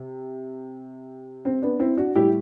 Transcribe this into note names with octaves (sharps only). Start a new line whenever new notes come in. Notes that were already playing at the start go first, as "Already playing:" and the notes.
Already playing: C3
C4
B3 D4
C4 E4
D4 F#4
A2 G3 E4 G4